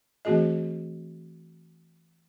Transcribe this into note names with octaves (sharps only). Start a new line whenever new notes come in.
E3 A3 C4 F#4 G#4 D#5